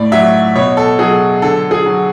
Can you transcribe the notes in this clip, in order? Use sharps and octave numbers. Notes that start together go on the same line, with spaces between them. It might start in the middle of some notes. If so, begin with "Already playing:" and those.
Already playing: A2 D5
F#3 E5
B2 C#5
A4
F#3 G#4
D3 A4
G#4
F#3